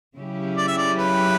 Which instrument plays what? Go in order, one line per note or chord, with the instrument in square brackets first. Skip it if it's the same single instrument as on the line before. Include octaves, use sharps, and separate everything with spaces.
[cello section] C#3 F#3 C#4 E4 G4
[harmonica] D5
E5
D5
B4